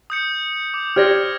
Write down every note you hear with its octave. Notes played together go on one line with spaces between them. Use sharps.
D#6 G6 C#7
D6
G4 C5 D5 F6 G#6 A#6